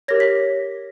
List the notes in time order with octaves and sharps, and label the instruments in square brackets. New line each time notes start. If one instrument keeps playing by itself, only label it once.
[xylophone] G4 A#4 C#5 A#6
B6